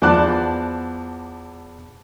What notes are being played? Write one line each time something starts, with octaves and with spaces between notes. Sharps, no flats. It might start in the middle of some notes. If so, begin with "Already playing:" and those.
E2 F3 B3 D5 A5 F#6